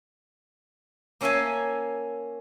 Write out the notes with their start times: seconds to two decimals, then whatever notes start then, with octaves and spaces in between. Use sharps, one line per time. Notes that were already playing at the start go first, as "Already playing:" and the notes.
1.21 A#3 C#4 A4 E5 F5 G#5